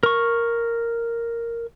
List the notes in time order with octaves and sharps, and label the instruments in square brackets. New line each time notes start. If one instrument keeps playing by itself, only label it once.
[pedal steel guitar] A#4 C#6